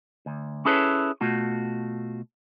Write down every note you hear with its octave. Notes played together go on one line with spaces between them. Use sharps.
D2
C#4 E4 G#4 A4 B4 C#5
B2 A3 F4 F#4